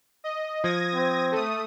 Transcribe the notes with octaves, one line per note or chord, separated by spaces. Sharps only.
D#5
F3 D#6 G#6 A#6
C4
A3 D#6